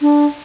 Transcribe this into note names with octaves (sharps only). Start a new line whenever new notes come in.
D4